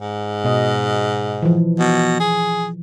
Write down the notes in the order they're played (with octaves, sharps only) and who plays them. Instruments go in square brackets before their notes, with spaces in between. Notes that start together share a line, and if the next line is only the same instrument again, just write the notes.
[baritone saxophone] G#2
[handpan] B2 D#5
E3 F3
[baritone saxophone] B2
G#4